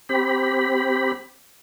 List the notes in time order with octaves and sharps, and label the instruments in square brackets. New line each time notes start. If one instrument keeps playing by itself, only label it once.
[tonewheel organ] C4 G4 B5